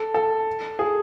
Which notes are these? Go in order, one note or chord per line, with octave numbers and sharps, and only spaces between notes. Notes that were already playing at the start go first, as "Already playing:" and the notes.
Already playing: A4
A4
G#4